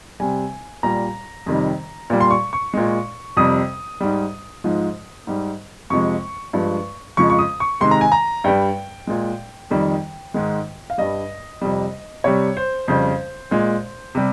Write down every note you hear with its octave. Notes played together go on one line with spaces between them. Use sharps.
C3 G3 G#5
A#2 G3 A#5
F2 C3 D#3 G3
A#2 G3
C6
C#6
C#6
A#2 G#3
F2 C3 G3 D#6
G#2 G3
G#2 F3 G#3
G#2 G3
F2 C3 F3 G#3 C#6
G2 F3 G#3
F2 C#3 F3 G#3 C#6
C#6
D#6
C#6
C3 D#3 G#3 C6
A#5
G#5
A#5
G2 G3 G5
A#2 G#3
F2 D#3 G3
G#2 D#3 G#3
F5
G2 G3 D#5
F2 C3 G3
C3 G3 C#5
C5
F2 C#3 G3 C5
A#2 G#3
C3 G3